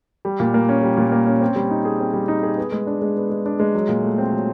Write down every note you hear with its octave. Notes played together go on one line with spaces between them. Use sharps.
G3
A#2
A#3
C#4
G3
A#2
A#3
C#4
C4
G3
D#4
G#4
C4
G3
D#4
G#4
B3
G#3
D4
G#3
B3
G#3
D4
G#3
F#3
A#2
A3
C4
F#3